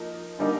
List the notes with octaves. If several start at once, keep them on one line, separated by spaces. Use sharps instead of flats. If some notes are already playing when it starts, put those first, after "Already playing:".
Already playing: F3 A#3 D#4
D3 G3 A#3 D#4